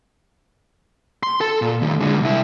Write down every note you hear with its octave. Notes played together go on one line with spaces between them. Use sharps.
C6
A4
A#2
D#2 A2
D3 G#3
C2 E4